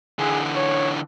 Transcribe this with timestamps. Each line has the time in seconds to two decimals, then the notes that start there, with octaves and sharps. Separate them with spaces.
0.19 D3 E3 G#4
0.56 C#5